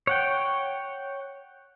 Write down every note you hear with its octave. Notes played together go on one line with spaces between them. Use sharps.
C#5 F#5 G5